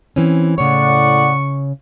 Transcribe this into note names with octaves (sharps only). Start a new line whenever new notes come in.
E3 C4 C#4
A2 C#3 C#5 D5 F#5 C#6